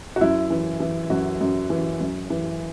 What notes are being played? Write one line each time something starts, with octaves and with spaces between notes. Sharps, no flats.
F#4
F#2 E4
E3
E3
F#2 F#4
F#2
E3
F#2
E3